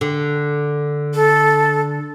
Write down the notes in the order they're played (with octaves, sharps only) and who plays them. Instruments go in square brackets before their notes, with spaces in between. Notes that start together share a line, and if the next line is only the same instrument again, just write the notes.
[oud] D3
[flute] A4